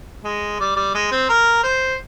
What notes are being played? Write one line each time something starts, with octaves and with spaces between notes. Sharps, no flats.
G#3
G3
G3
G#3
C4
A#4
C5